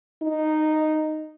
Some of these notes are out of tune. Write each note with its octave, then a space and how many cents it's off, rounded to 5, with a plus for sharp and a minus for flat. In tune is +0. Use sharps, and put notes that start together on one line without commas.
D#4 -10